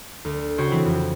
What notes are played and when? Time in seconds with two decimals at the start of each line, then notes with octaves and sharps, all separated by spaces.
0.25 D2
0.58 C#3 F#4 C5 C#5 G5
0.72 E3 C4 E4
0.85 F2